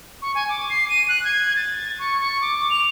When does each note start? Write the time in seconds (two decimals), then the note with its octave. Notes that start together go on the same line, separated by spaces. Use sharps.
0.22 C#6
0.35 G#5
0.49 D6
0.70 C7
0.89 D#7
1.09 F#6
1.25 G#6
1.56 A6
1.99 C#6
2.20 C#6
2.42 D6
2.70 F7